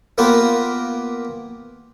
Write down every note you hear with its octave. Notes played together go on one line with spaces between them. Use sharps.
A#3 B3 F4 G4 A#4 B4